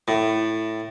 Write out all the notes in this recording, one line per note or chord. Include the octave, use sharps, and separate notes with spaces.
A2